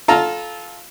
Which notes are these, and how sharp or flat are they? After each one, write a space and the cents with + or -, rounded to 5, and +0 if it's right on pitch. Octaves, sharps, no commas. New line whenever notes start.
F4 +0 A4 -20 A#5 +0